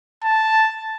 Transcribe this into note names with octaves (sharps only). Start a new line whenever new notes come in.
A5